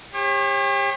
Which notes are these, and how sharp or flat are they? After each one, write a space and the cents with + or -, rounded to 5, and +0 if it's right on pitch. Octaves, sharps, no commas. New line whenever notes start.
G4 +35 C#5 -35